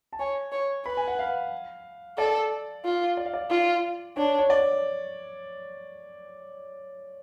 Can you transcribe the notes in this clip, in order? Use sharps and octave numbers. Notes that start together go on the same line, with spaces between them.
A5
C#5 G#5
C#5
B4 B5
G#5
F#5
F5
A4 D5
F4
D5
F5
D5
F4
D4 C#5
C#5
D5